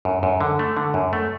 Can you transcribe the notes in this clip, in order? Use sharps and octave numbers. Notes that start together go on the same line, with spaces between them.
F#2
F#2
D3
A3
D3
F#2
A3